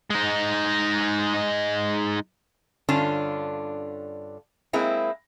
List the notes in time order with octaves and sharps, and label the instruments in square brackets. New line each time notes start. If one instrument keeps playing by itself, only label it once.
[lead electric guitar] G#3 D#4
[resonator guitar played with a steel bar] G2 D3 C#4 D4 F4 A5
G#3 A#3 C4 E4